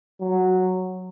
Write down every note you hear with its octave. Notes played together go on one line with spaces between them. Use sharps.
F#3